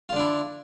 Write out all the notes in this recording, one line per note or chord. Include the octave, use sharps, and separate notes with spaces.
D3 D4 E4 F4